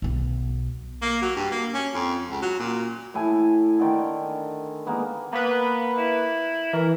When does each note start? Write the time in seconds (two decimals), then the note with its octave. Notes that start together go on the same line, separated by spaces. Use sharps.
0.02 B1 B3
1.02 A#3
1.21 F#3
1.36 G2
1.51 A#3
1.73 C#4
1.93 F2
2.29 C#2
2.41 F#3
2.59 A#2
3.14 A2 E4 G#5 A5
3.80 D3 D#3
4.86 G#3 A#3 B3
5.33 A#3 B3 B4
5.98 E4
6.73 E3 A#4